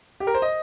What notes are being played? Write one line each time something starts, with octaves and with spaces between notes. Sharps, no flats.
G4
A#4
C5
D#5